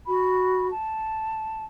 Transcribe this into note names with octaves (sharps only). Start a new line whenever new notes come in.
F#4 B5
A5